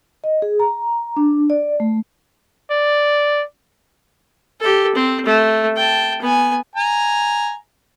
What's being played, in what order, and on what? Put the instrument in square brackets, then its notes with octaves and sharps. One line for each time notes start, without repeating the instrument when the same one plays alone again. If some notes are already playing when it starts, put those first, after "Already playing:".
[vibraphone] D#5
G#4
A#5
D4
D5
A3
[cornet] D5
[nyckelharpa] G4 A4
C4
A3
G5 A5
B3 G#5
[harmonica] G#5 A#5